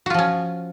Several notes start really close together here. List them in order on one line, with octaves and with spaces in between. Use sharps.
F#4 F4 F3 C#4